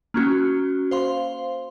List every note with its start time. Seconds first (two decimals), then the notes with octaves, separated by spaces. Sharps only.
0.14 A#3 C#4 F#4
0.91 C5 F5 C6